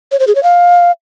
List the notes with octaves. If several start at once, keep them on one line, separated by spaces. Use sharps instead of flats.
C#5
C5
G#4
C#5
F5